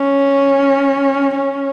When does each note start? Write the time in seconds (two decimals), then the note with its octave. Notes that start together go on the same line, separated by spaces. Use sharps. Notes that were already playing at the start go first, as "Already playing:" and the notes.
Already playing: C#4
1.35 C#4